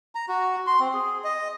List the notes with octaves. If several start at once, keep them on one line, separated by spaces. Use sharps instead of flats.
A#5
F#4
C6
C4
G#4
D#5